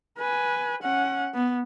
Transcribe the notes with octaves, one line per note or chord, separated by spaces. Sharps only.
B4 G#5
C#4 F#5
B3